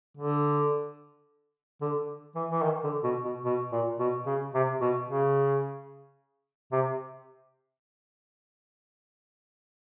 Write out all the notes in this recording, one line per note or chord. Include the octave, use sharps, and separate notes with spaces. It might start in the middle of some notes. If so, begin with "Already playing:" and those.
D3
D3
E3
E3
D#3
D3
B2
B2
B2
A#2
B2
C#3
C3
B2
C#3
C3